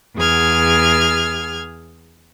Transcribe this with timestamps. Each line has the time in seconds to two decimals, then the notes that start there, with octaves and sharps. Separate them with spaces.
0.16 E2 G#4 F6 G#6